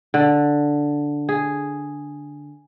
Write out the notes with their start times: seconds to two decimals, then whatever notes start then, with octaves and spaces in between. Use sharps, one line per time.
0.14 D3
1.29 G#4